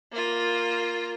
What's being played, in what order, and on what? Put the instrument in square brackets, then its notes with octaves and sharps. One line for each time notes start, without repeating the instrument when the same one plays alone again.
[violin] A#3 F4